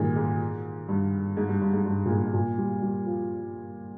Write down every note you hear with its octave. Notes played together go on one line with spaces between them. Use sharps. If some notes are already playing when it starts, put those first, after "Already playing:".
Already playing: A#2 D#3 F3 G3 G#3
G#2
G2
G#2
G2
G2
G#2
G2
A#2
G#2
G#2
A#2
G3
G3
F3